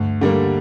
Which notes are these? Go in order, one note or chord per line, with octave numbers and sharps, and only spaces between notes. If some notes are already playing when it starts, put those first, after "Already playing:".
Already playing: D2 G2
D3 G3 A#3